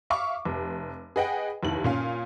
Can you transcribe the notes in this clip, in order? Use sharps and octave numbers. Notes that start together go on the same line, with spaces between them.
E5 F5 C#6 D6
F1
G#4 B4 D#5 F#5 G5
F1 D#2 E4 F#7
A#2 C#4 F5